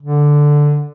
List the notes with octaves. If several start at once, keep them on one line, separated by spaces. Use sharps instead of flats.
D3